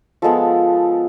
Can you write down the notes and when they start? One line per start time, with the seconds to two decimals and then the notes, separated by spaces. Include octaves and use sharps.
0.22 F3 G#3 B3 A4